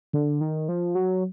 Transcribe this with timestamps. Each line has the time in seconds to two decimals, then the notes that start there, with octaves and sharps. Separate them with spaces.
0.13 D3
0.41 D#3
0.69 F3
0.95 F#3